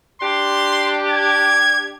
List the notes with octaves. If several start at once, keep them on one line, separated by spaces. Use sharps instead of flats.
D4 G4 C6
G#6